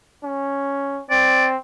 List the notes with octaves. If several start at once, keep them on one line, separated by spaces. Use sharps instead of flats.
C#4
C4 D5